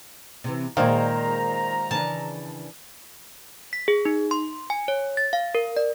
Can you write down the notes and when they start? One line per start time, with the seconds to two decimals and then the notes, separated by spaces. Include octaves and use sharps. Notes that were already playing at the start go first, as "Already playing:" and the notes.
0.44 C3 E3
0.77 A#2 D#3 G#3 A#4 C5 D5 F5 A#5
1.91 C#3 E3 D4 A5
3.73 B6
3.88 G#4
4.05 D#4
4.31 C6
4.70 G#5
4.88 C#5
5.17 A6
5.33 F5
5.55 A#4
5.77 D5